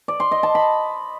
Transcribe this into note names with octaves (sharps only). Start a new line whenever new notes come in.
D5
C6
D#5
A5
B5